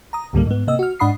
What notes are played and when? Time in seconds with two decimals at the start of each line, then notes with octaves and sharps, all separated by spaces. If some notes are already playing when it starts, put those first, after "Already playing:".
0.13 A#5 D#6
0.33 C#2 G#2 D3 G3 A3 A#3
0.46 G#2 B3
0.67 C3 A#3 D#5 E6
0.79 F#4 F6
0.99 G#2 D4 F#5 B5 D#6 C7